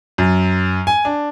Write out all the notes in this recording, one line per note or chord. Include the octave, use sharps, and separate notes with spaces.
F#2
G#5
D4